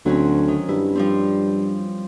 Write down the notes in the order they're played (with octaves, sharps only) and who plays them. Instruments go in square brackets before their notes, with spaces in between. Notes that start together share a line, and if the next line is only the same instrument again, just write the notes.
[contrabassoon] D2 [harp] F#3 C4 C#4
[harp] D#3
[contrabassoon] G2 [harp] E4
[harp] F3 G3 C4